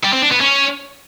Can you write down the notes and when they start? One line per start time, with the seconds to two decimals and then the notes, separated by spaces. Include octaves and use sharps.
0.03 G3
0.13 C4
0.22 D4
0.32 B3
0.41 C#4